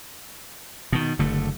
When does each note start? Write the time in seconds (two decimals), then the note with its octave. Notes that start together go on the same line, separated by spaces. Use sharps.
0.92 B2 D#3
1.19 F#1 D3 A3